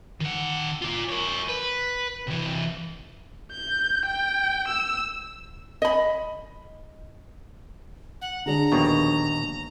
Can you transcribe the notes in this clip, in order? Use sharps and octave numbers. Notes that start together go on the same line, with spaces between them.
D#3 F#5
F4 D5
A#4 C#5
B4
C3 E3
G6
G5
E6
D#5 B5
F#5
D3 G#3 D4 A#5
A#1 D#2 B2